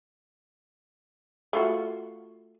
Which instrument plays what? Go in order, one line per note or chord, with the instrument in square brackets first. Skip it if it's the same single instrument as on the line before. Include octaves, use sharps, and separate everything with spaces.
[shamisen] A3 F4 F#4